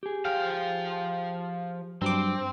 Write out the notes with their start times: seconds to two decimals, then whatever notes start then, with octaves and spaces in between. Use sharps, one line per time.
0.03 G4 G#4
0.25 F3 F5 G5
2.02 G2 F#3 C4 D6